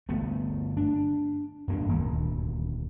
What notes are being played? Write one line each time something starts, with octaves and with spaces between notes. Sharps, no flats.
G1 A3 B3
D4
G2 A#3 D4
D#1 D2